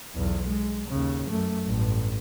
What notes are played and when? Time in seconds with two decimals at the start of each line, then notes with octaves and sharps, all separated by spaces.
0.15 B1 E2
0.49 G#3
0.89 D#2 C#3
1.29 F#2 A3
1.66 A1 G2